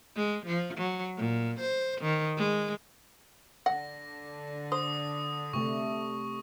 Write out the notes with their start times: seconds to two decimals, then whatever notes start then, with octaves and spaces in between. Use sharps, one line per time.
0.16 G#3
0.46 F3
0.78 F#3
1.17 A#2
1.60 C5
2.02 D#3
2.37 G#3
3.66 D3 D4 F#5 A#6
4.72 C5 D#6
5.53 C3 A3 C#6